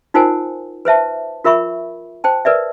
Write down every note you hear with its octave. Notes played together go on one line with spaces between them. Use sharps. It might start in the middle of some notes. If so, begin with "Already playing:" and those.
D#4 F4 A#4 C5 F#5 G#5
B4 C5 E5 A5
F4 A#4 E5 B5 C#6
C5 G5 A5
A#4 B4 D5 E5